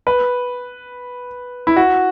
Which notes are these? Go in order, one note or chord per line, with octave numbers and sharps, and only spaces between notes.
B4
E4
F#4